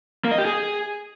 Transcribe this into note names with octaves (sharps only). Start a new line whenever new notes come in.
A#3
D#5
G4
G#4